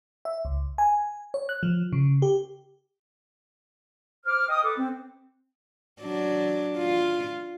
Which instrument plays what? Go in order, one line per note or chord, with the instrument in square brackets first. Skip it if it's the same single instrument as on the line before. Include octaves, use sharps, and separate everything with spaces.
[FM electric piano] E5
C#2
G#5
C#5
F#6
F3
C#3
G4
[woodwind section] C5 D6 F6
D#5 G5 D#6
A4 B4 D6
C4
[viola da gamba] F#3 D4
F4